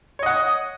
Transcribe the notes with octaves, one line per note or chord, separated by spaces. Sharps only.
C#5 D#5 F#5